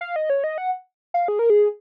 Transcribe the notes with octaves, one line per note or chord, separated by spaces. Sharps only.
F5
D#5
C#5
D#5
F#5
F5
G#4
A#4
G#4